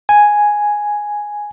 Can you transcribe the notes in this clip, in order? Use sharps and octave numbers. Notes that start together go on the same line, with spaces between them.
G#5